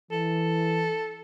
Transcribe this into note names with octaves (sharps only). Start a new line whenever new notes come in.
E3 A4